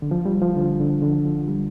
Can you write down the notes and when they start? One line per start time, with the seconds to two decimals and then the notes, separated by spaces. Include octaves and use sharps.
0.02 D3
0.11 F3
0.25 G3
0.41 F3
0.56 D3
0.80 D3
1.02 D3
1.25 F3
1.48 G3